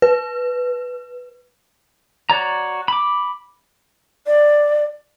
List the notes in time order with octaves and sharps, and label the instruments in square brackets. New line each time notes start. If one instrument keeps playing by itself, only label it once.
[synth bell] B4
[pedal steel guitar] F#4 C#5 D5 A#5
B5 D6
[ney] D5